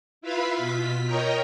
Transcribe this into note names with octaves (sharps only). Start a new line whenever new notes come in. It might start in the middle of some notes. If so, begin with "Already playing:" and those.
E4 F4 B4 E5 F5 B5
B2 F4 B6
A#4 C#5 D#5 G5 A#5